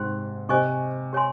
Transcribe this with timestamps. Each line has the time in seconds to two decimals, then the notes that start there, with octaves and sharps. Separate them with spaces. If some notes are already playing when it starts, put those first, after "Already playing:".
Already playing: G#2 C3 G4 C5 G5 C6
0.49 C3 C5 D#5 G#5 C#6
1.13 G4 C#5 G#5 C6